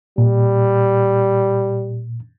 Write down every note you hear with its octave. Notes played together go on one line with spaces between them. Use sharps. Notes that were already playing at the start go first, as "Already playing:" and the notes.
A#2 G3